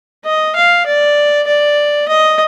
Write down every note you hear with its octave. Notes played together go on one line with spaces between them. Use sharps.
D#5
F5
D5
D5
D#5